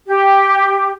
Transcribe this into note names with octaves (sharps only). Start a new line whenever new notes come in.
G4